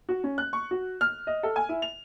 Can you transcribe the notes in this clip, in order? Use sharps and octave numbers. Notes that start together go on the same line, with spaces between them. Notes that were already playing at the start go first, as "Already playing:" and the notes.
F#4
C#4
F#6
C#6
F#4
F6
D#5
A4
G#5
E4
F7